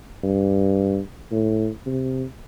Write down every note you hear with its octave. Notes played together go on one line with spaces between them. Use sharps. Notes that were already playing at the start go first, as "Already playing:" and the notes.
G2
A2
C3